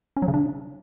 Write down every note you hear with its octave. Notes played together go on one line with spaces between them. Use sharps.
C#4
F#3
C#3
D4